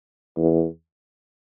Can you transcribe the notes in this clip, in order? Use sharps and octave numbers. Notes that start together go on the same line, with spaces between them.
E2